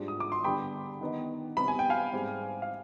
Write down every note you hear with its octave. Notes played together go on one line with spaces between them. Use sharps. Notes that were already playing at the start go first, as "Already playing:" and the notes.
Already playing: G#2 G3 D4 F4
D#6
D6
C6
G2 D3 G3 B3 G5 B5
D#3 B3 D#4
C3 G3 B3 B5
G#5
G5
F5 G#5
G#2 G3 C4
F5